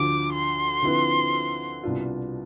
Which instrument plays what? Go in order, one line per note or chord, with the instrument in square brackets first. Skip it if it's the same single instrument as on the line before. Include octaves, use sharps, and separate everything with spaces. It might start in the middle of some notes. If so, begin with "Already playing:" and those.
Already playing: [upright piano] D2 D3 F3 [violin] D6
[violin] C6
[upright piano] D3 F3 C4 E4 B4
C2 B2 B3 D4 F4